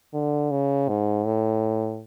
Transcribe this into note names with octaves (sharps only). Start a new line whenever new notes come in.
D3
C#3
G#2
A2